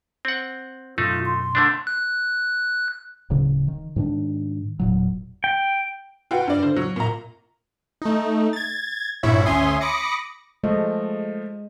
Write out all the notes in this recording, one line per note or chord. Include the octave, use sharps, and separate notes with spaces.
C4 F#5
F#2 B2 A3 D#4 F4
C6
D3 A3 D4
F#6
D1 C#3
D#3
G#2 D#3 D4
E1 A#2 F#3
G5
F4 F#4 B4 G5
G2 D5
D3 C5
F#3
A#2 A#5
A3 D#4
G#6 A6
G#1 G2 A#2 E4 C#5 E5
D2 C#4 E5 G#5 C6 D#6
B5 D6 D#6 A#6 C#7
F3 G#3 A3 D#5